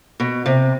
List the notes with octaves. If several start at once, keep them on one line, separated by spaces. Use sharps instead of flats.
B2
C3